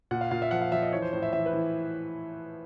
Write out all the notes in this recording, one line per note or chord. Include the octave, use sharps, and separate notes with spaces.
A#2 F#5
F5
A#2 F5
E5
F3 F#5
F5
F3 E5
D#5
E3 C#5
C5
A2 C5
E5
E3 E5
B4
E3